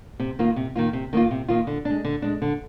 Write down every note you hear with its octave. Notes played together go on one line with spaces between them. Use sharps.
C3
D#3 A#3 F4
C3
D#3 A#3 F4
C3
D#3 A#3 F4
C3
D#3 A#3 F4
D3
G#3 D4
D3
G#3 D4
D3